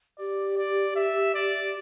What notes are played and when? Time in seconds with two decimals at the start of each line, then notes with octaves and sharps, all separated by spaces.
0.19 G4 D5
0.58 D5
0.96 E5
1.34 D5